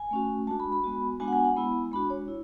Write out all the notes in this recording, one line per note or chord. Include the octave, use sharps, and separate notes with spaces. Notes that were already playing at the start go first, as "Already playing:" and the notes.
Already playing: G#5
A3 C#4 F#4
G#3 D4 F#4 A5
B5
B5
G#3 B3 F#4
G#3 B3 D4 F#4 G#5
F#5
G#5
F#5
G#3 B3 E4 B5
G#3 D4 F#4 B5
C#5
E4